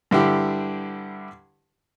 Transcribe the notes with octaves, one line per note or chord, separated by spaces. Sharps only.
G2 D3 E4 G4